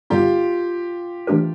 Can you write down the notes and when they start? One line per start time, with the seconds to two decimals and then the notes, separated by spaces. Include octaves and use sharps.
0.10 G2 D3 G3 B3 D#4 F4 G4
1.27 E3 A3 D4 G4 A#4